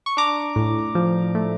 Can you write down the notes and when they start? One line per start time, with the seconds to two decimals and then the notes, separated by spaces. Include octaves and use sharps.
0.06 C#6
0.17 D4 A#5 D6
0.56 A2
0.95 F3
1.35 A3